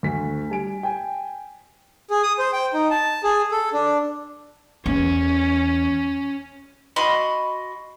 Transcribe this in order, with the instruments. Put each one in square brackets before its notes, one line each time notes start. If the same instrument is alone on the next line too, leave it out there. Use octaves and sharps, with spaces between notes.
[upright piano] D2 B6
G3 G#5 D7
G5 G#5
[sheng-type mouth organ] G#4
D#6
C5
G5
D#4
A5
G#4
A4
D4
[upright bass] E2 [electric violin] C#4
[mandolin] F#4 D#5 B5 C6